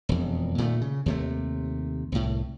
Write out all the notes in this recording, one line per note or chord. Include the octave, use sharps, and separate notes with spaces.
E1 F2
A#2 D#3 G3 A3
C#3
D#2 C3 A3
C2 A2